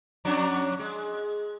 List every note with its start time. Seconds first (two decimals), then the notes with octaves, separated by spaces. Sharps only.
0.25 F2 F#3 D4
0.80 G#3